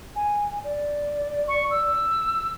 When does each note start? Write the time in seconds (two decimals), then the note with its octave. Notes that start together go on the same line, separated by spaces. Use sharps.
0.15 G#5
0.64 D5
1.48 C#6
1.71 E6